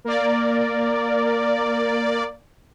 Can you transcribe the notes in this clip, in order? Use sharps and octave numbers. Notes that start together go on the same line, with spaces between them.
A#3 A#4 D5